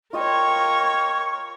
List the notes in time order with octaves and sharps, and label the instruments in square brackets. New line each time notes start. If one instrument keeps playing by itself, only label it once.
[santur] F4 D#5 G5 [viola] A#4 C#5 [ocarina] C#6